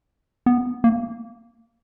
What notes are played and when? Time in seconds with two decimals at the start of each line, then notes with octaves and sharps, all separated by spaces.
0.46 B3
0.84 A#3